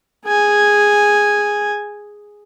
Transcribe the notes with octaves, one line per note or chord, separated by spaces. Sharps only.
G#4 G#5